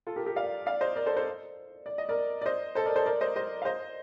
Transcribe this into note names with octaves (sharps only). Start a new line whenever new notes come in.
F4 A4
G4 A#4
G4 A#4
D5 F5
D5 F5
C5 D#5
A#4 D5
A4 C5
A4 C5
D5
D#5
A#4 D5
D5
C5 D#5
A4 C5
A#4 D5
A4 C5
A#4 D5
C5 D#5
C5 D#5
F5
C5 D#5